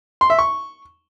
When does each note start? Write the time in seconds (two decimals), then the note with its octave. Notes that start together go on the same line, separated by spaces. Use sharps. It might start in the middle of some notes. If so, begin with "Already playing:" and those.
0.21 C6
0.30 E5
0.39 C#6